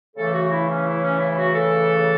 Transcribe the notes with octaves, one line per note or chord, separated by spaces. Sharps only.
C#3 E3 A3 A4
F#4
E4
C#4
E4
C#4
E4
F#4
A4